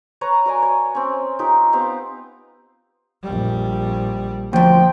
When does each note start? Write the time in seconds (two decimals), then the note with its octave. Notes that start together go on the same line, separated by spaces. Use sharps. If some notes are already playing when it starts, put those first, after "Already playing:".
0.21 B4 C#5 A#5 C#6
0.46 F#4 A#4 D5 G#5
0.62 C#5
0.95 C4 C#4
1.39 D#4 F4 G4 A#4
1.73 B3 C4 G4 F5
3.23 A#1 G3
4.53 D2 A#2 F3 G5